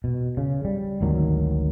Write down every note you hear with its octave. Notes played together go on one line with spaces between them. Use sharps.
B2
C#3
G3
G#1 D2 D#3 F#3